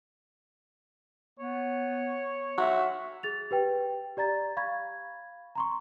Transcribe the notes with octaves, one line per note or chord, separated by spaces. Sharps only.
B3 C#5
F#4 E5
G#4 A6 F7
G4 B4 G5
G4 D5 A#5 A6
F5 B5 C#6 G#6
A#5 C6 C#6